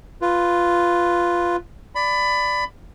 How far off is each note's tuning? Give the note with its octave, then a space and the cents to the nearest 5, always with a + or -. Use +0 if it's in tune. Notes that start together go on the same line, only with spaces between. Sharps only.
F4 +0 B4 +0
D5 +0 B5 +20